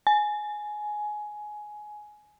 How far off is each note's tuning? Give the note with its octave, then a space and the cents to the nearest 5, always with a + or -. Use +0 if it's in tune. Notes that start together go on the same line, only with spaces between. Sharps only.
G#5 +15